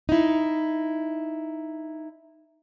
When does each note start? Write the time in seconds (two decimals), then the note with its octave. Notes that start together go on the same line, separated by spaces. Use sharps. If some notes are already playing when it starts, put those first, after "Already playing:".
0.09 D#4 E4